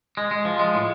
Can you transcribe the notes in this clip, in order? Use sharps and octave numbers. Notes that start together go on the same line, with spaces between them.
G#3
G#3
F3
G#3
A2